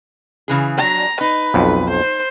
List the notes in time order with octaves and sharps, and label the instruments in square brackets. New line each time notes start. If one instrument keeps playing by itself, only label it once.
[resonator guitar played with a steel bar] C#3 E3 G#4
[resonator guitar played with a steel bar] F#3 D4 [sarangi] A#5
[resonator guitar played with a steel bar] D#4 [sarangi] B4
[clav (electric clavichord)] B1 F2
[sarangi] C5